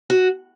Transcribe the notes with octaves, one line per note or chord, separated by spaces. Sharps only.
F#4